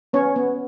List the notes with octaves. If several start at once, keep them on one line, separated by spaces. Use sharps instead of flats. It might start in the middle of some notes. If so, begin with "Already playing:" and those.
B3 C#4 C#5
B3